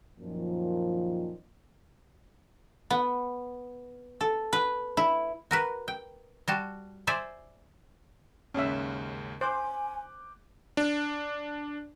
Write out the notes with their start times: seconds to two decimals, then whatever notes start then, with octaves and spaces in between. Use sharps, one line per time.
0.20 F#2 A#2 D#3 F3
2.90 B3
4.21 A4
4.53 B4
4.97 E4
5.51 F#4 A#4 B4
5.88 G5
6.48 G3 F#4 A5
7.07 C5 D5 E5 G#5
8.54 D#2 G#2 C#3 C#4 E5
9.41 C5 G#5 D6 F#6 G6
10.77 D4